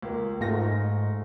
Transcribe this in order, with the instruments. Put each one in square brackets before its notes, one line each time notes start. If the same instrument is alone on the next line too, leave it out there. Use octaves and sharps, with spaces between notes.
[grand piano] C#2 A#3
[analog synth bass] G#2 [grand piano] A3 F4 A#6